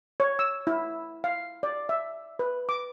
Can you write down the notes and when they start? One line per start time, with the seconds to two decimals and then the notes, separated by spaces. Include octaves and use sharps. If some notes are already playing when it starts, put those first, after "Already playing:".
0.20 C#5
0.39 E6
0.67 E4
1.24 F5
1.63 D5
1.89 E5
2.39 B4
2.69 D6